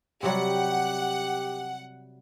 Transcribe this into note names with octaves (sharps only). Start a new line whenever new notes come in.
C3 F#3 G3 G4 F#5